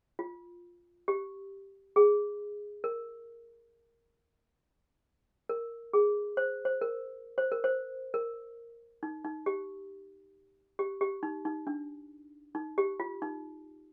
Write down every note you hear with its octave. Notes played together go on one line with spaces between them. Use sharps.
F4
G4
G#4
A#4
A#4
G#4
C5
C5
A#4
C5
A#4
C5
A#4
D#4
D#4
G4
G4
G4
D#4
D#4
D4
D#4
G4
F4
D#4